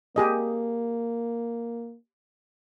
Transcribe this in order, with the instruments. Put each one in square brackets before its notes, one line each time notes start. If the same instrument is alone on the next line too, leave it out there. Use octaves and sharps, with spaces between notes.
[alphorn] A#3 [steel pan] G4 G#4 D#5